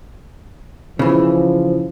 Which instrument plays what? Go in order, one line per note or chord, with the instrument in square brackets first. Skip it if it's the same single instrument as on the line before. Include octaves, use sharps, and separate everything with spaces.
[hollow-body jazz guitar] C#3 E3 [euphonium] F3